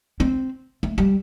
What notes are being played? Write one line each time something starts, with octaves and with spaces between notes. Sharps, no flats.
C4
A3
G3